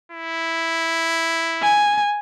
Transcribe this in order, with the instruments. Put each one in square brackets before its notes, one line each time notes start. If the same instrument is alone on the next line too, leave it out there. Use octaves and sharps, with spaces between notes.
[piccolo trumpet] E4
[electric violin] G#5